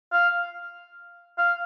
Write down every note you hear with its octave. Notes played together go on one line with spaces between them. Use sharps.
F5
F5